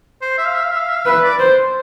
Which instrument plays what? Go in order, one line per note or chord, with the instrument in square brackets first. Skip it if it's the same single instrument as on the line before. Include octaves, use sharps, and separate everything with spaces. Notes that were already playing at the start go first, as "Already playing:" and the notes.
[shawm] C5
E5
F5
E5
F5
E5
F5
E5
F5
[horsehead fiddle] B4 [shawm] E5
[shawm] D5
[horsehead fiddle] C5